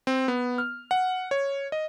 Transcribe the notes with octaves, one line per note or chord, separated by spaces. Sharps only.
C4
B3
F6
F#5
C#5
D#5